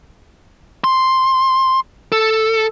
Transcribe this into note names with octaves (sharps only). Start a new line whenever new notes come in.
C6
A4